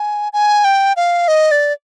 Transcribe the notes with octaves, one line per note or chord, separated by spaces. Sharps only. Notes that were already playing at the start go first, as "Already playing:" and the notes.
Already playing: G#5
G#5
G5
F5
D#5
D5